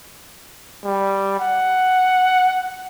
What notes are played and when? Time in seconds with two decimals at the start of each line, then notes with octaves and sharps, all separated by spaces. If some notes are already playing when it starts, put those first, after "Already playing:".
0.84 G3
1.40 F#5